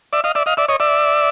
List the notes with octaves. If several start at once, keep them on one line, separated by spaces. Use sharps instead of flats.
D5 E5
D#5 F5
D5 E5
D#5 F5
D5 E5
C#5 D#5
D5 E5